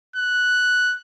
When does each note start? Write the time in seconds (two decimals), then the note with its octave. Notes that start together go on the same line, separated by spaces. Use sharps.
0.16 F#6